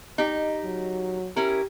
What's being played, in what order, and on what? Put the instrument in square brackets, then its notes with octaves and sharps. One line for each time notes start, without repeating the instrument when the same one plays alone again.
[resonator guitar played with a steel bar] D#4 G4
[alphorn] F#3
[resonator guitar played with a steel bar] C#4 E4 A#4 [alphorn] G4